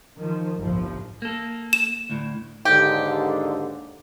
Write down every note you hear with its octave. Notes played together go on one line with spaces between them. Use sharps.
D#3 F3
G1 C2 A2 F3
A#3 A4
E7
D2 A2
D#2 G#2 D3 G4